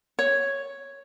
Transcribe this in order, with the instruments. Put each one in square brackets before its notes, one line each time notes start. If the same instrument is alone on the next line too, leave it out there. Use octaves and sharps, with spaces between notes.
[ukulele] C#5